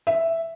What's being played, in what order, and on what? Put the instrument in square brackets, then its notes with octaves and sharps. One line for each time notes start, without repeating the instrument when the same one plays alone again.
[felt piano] E5